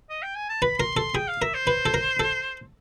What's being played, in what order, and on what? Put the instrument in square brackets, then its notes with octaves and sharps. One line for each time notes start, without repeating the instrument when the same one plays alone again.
[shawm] D#5
G5
G#5
A5
[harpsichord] B4 [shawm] B5
[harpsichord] A#4 [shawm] C6
[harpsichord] A4 [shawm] C6
[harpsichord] G#4 [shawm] G5
[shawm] F5
[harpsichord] A#4 [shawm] E5
[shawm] C5
[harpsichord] B4
A4
A#4
A4